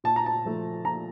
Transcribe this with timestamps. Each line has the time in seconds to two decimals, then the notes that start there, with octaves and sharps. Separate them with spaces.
0.04 A#2 A5
0.16 A#5
0.26 A5
0.45 F3 A3
0.85 A#2 A#5